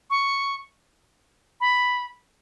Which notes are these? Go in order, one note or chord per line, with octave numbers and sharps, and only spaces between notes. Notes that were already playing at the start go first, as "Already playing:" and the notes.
C#6
B5